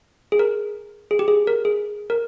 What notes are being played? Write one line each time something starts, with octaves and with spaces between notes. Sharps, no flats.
G#4
A#4
G#4
G4
G#4
A#4
G#4
A#4